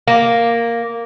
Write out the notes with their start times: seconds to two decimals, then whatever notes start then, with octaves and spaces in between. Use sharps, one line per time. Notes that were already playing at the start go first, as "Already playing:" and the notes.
0.08 A#3